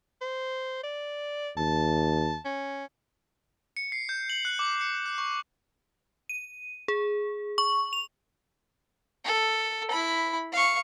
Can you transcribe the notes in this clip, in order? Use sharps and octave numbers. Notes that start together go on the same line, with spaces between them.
C5
D5
D#2 A5
C#4
C#7
C7
G6
F#7
F#6
D6
C#7
F#6
C#6
D#7
G#4
C#6
F7
A4
E4 B5
F5 C#6